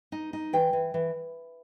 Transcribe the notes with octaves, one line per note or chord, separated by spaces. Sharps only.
D#4
D#4
E3 G5
E3
E3